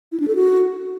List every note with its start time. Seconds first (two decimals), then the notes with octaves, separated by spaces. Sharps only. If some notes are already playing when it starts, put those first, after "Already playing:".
0.12 E4
0.20 D4
0.28 A4
0.35 F#4